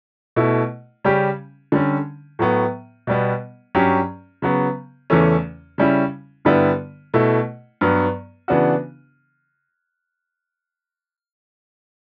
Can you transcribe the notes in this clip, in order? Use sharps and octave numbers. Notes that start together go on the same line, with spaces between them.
B2 A3 E4
C#3 G3 C#4 G4
D3 G3 C#4
A2 F#3 B3
B2 G3 B3
G2 F#3 C#4 G4
C#3 F#3 B3
E2 C#3 E3 A3 C#4
C#3 G3 C#4 E4
G2 D3 G3 B3 E4
B2 A3 E4
G2 F#3 B3
C#3 E3 B3 D4 F#4